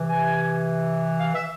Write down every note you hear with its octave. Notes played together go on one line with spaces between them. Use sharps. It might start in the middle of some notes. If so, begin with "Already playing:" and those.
Already playing: C3 E3
G#5
F5
E5